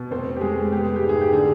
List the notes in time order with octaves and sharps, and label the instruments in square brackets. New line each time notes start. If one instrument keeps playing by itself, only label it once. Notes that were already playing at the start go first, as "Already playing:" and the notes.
Already playing: [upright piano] B2
F1 C4 C5
G4
F1 G#3 G#4
B3 G4
G#4
G4
G#1
G#4
G4
D3 G#4